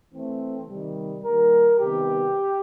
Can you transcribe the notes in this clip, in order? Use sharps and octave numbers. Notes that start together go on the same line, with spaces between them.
E3 A3 C4
C3 D#3 G3
D#3 G3 A#3 A#4
C3 D#3 G3 B3 G4